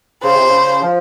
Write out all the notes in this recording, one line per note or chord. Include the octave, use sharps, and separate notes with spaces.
C#3 C5
C3
C#3
F3